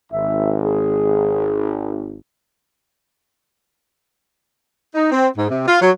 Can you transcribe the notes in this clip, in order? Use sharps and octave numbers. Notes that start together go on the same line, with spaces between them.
G#1 E5
G#4
D#4
C4
G#2
C3
F4
F#3